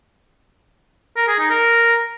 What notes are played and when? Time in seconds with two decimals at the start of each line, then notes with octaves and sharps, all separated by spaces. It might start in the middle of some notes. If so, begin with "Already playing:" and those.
1.17 A#4
1.28 G#4
1.39 D#4
1.50 A#4